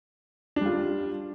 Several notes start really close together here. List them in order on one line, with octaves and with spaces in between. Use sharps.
D4 G3 F4